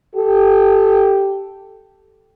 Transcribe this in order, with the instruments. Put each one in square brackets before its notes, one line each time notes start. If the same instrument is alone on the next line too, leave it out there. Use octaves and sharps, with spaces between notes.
[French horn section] G4 A4